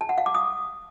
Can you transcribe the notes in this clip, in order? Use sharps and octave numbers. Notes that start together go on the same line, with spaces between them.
A5
F#5
F5
D6
D#6